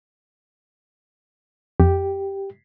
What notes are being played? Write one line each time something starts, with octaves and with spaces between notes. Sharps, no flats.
F2 G4